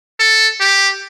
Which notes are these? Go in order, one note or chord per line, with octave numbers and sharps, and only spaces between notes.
A4
G4